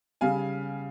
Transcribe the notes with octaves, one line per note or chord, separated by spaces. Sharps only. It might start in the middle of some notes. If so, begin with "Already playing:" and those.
C#3 G3 F5 G#5